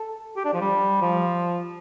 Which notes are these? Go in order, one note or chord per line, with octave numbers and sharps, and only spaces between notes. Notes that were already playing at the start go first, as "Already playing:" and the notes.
Already playing: A4
G4
D4
F3
G3
F3